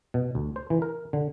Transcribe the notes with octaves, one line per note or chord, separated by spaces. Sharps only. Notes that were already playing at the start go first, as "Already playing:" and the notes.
B2
D2
C5
E3
A#4
D3